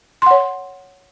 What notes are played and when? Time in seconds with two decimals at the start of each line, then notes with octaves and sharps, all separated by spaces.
0.22 C6
0.26 F#5
0.31 C#5